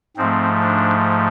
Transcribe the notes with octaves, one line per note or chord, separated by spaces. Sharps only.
G#2 F3 A3 C4
D4